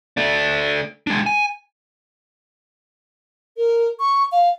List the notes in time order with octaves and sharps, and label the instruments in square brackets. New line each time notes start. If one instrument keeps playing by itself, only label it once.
[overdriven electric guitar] A3 D4
G#3 D4
G#5
[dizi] A#4
C#6
F5